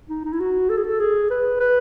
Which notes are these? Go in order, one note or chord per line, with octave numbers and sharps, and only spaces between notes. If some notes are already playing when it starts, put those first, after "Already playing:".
D#4
D#4
E4
F#4
A4
G#4
A4
G#4
B4
B4